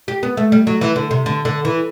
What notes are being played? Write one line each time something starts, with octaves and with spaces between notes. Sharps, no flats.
G4
B3
A3
G3
F#3
E3
D3
C3
D3
D3
E3